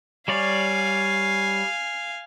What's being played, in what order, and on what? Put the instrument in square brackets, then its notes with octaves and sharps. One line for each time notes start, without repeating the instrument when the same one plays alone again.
[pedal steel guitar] G3 C#5 D5 [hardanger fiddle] F5 G#5